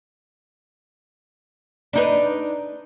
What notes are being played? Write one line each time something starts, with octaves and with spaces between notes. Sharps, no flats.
D4 D#4 B4